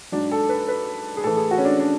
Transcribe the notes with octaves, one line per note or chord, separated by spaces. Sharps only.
G#2 F#3 D4
A4
B4
B4
G#4
A2 E3 A4
G#4
F#4
C#4
D4
D4